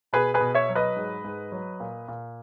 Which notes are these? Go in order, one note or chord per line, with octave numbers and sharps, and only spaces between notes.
B2 G#4 B4
G#4 B4
B2
C#5 E5
F#3
B4 D#5
G#2
G#2
F#3
A#2
A#2